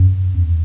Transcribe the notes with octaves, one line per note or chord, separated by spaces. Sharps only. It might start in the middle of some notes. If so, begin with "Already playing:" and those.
Already playing: F#2
E2